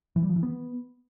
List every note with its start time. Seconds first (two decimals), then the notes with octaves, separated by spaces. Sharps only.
0.16 E3
0.23 G3
0.29 F3
0.36 E3
0.43 B3